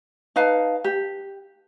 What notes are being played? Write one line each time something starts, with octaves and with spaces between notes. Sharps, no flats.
D#4 B4 F5 A5
G4